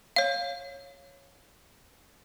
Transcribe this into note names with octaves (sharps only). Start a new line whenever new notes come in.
C#5 F5